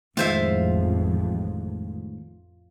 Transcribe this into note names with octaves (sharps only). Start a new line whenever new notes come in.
A1 F2 A2 D#3 G#3 F4 C5 E5